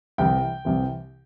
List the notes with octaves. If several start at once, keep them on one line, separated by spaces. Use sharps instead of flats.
C2 C3 E3 G5
C2 C3 E3